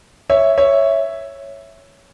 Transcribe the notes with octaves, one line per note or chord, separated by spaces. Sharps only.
C#5 E5
C#5 E5